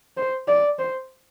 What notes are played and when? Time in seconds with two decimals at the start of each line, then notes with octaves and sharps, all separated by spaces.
0.17 C5
0.48 D5
0.79 C5